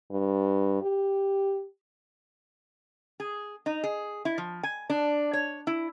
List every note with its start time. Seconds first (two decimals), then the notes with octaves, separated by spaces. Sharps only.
0.11 G2
0.82 G4
3.20 G#4
3.66 D#4
3.84 G#4
4.25 E4
4.38 F3
4.63 G#5
4.90 D4
5.33 C#5
5.67 E4